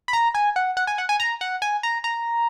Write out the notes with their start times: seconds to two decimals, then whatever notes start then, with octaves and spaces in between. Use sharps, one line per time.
0.08 B5
0.13 A#5
0.34 G#5
0.56 F#5
0.77 F#5
0.87 G#5
0.98 F#5
1.09 G#5
1.20 A#5
1.41 F#5
1.62 G#5
1.83 A#5
2.04 A#5